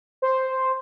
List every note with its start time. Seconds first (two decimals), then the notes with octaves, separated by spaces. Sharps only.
0.22 C5